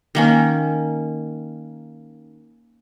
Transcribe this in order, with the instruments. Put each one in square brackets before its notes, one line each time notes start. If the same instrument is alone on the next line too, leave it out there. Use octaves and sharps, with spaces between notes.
[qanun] D#3 A#3 C#4